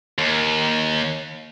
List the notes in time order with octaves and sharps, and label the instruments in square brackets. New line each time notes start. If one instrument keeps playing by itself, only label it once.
[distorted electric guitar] D#2